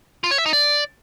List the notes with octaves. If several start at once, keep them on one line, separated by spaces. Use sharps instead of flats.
F4
C#5
E5
D#4
D5